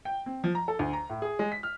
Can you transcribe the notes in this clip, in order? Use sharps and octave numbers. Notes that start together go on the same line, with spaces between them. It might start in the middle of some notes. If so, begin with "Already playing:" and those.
G5
C4
F3
A#5
A4
D2
A#5
A2
G#4
G#3
B6
F6